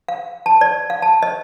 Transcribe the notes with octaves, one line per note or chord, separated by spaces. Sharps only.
F5
A5
D5
F5
A5
D#5